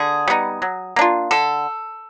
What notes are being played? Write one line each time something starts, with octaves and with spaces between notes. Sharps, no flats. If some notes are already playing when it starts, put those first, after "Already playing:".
Already playing: D3 G#4
G3 B3 D#4
F#3
A#3 D4 F4
D3 A4